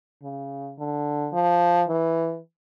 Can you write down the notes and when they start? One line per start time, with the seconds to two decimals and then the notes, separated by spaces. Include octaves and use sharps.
0.23 C#3
0.78 D3
1.33 F3
1.88 E3